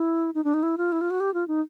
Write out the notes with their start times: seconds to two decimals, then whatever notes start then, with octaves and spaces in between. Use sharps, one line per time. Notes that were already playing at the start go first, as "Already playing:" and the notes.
Already playing: E4
0.35 D#4
0.44 D4
0.54 D#4
0.63 E4
0.78 F4
0.92 E4
1.01 F4
1.10 F#4
1.20 G4
1.34 F4
1.48 D#4